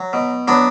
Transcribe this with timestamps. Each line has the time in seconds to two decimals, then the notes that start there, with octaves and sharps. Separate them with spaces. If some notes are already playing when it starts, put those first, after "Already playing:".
Already playing: F#3
0.13 B2
0.48 F#3 B3 D4